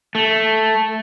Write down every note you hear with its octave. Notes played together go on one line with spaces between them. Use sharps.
A3